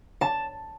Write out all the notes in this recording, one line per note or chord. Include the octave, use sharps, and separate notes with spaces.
A5